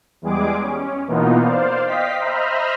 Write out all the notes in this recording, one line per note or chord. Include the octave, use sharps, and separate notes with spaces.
E2 G3 G#3 G#4 D6
C#4
B2 E3 A#3 B3 D#4 F4
C5 D5 F5
D#5 F5 G5 B6
C5 D#5 E5 A#5 B5 F6